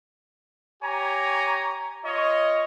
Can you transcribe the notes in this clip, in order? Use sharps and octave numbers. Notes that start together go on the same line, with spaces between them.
G4 C#5 G#5 A#5
F4 C#5 D#5